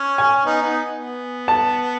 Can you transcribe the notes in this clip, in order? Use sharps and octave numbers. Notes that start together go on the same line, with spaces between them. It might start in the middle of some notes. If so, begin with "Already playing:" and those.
Already playing: C#4
G#5
B3 D#4
B3 D#4
B3
A5